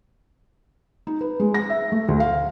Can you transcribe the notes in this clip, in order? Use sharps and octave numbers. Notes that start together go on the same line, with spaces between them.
D#4
B4
G#3
A#6
E5
A3
D2
F5